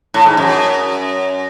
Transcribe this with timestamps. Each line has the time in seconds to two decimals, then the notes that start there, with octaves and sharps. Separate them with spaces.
0.14 A2
0.26 G#2
0.37 F#2